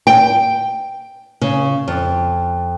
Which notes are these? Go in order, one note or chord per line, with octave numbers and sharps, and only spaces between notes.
G5
C#3
F2